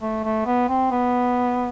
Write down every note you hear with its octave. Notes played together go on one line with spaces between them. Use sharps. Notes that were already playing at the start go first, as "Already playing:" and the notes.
A3
A3
B3
C4
B3